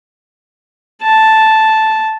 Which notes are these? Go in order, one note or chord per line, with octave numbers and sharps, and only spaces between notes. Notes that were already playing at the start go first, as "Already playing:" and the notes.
A5